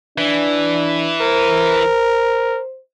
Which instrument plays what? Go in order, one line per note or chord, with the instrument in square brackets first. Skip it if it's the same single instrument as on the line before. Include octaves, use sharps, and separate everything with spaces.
[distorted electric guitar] E3 [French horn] D4
[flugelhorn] A#4 [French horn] C5